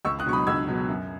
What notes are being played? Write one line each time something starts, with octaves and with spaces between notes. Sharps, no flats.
C#2 C#6 E6
D#6 F#6
B2 F#3 C#6
B5 D#6
C#2 E6 G#6
B2 F#3
F#2